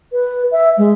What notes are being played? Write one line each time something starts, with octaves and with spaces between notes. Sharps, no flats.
B4
E5
G#3